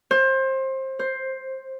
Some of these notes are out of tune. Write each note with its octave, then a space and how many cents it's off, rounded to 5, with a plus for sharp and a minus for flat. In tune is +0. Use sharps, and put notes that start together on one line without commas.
C5 +25
C5 +10